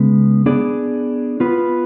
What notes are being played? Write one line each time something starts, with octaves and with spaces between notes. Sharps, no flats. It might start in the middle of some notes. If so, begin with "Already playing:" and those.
Already playing: C#3 G#3 B3
B3 D4 G#4 D5
B3 F4 B4